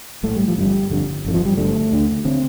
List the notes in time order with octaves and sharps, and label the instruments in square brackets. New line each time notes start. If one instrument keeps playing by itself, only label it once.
[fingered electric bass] A#1 A2 A3
G3
F3
G1 F2 D3 G3
G1 F2 D3
G1 F2 D3
F3
G3
G1 F2 D3 A3
D2 D3
D3 C4